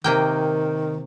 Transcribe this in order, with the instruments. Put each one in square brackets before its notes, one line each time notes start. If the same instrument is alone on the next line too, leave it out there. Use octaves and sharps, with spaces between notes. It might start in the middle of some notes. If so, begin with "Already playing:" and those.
[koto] C3 A#3 G5 [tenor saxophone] D#3